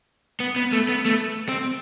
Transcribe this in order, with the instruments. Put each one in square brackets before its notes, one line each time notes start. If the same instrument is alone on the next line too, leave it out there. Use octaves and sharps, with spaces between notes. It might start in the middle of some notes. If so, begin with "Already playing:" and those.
[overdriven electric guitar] B3
B3
A3
B3
A3
C4